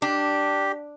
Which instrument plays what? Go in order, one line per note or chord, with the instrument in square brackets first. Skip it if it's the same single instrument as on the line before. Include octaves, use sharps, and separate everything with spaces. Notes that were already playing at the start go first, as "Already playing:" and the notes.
[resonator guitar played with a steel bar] D4 [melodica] G4